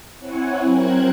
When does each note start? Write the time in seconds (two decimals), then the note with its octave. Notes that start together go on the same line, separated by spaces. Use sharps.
0.20 C4 E4 C#5 F#5 G#5
0.63 F#3 C4 A#4 C5 F#6 G#6